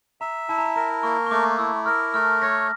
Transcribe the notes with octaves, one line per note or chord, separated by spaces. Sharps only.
E5 A#5
E4 A5
A#5
A5
A#4 A#5
A#3 C#6
C#6
A3 D6
E4 E6
A#4 F6
A3 F6
C#5 A#6